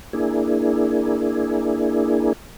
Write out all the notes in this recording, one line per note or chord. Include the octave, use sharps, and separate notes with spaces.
A#3 D4 E4 G#4